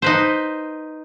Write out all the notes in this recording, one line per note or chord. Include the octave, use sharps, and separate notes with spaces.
D#4 B4 C5